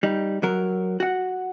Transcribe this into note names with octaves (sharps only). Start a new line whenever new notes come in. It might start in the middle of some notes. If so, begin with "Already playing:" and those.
G3 D#4
F#3 A#4
F#4 F#5